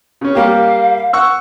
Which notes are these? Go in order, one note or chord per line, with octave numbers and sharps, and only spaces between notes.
C#3 C#4
G3 A#3 G4 F5
F#5 C#6 E6